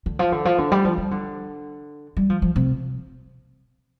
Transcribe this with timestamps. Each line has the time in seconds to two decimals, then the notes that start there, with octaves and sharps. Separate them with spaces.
0.06 D3
0.19 F3
0.32 D3
0.45 F3
0.58 D3
0.72 G3
0.85 F3
0.98 G3
1.11 D3
2.17 G3
2.30 F3
2.42 F3
2.56 C3